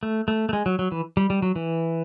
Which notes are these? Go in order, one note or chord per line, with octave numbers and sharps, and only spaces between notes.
A3
A3
A3
G#3
F#3
F#3
E3
G3
G3
F#3
E3